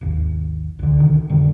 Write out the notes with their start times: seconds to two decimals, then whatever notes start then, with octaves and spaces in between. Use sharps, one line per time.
0.01 G#1 D#2
0.79 C#2 D3
0.97 B2 D3 D#3
1.30 F1 D3 G3